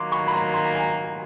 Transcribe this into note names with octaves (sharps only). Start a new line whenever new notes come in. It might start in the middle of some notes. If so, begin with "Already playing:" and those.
Already playing: D#3 F#3 A#3 C6 D6
B5 C#6
B5
A#5 C6
A#5 C6
G#5 A#5